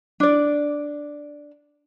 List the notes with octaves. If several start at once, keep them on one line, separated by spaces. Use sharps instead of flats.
D4 D5